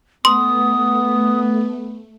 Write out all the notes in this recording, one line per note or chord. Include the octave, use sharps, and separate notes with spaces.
A3 B3 C6 D#6